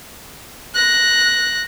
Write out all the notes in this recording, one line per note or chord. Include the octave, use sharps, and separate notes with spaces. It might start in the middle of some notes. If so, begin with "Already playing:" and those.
F#6 A#6